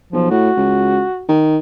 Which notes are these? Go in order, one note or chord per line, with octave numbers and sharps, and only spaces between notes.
B1 F3
A2 F#4
C#2
D#3